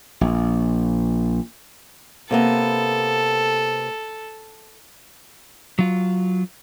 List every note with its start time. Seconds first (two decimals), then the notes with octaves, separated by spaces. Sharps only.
0.21 A#1
2.31 C3 A#3 B3 A4
5.79 F#3 F4